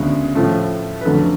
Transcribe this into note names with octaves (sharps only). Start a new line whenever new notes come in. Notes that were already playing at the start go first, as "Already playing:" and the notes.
Already playing: D2 C#3 G#3 B3
A2 F3 A3
B4
F2 D3 F#3 A3 C#4 A4